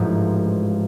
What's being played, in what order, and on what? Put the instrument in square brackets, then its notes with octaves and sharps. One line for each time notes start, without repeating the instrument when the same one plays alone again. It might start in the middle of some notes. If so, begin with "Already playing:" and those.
Already playing: [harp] A1 G#2 F3 A3